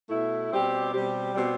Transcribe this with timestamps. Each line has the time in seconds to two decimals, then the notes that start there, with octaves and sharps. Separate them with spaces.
0.10 B2 A3 E4
0.51 B2 G3 C4 G4
0.93 B2 G3 C4 G4
1.35 B2 G3 C4 G4